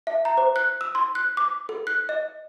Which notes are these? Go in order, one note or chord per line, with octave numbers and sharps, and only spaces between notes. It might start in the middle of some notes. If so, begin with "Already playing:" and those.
E5
A#5
C5
F#6
E6
C6
F#6
D6
A4
F#6
D#5